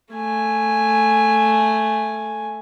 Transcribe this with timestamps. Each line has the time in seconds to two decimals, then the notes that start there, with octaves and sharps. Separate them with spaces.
0.13 A3 G#5